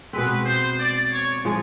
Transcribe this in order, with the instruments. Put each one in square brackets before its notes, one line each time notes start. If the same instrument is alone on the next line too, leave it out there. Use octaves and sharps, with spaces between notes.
[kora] B2 G#3 C4 [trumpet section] B4
[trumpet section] C5
D5
C#5
[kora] F3 G#3